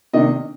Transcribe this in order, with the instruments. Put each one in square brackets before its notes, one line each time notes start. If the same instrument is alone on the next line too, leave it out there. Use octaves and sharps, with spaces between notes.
[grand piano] C3 D#3 A#3 D4 D#5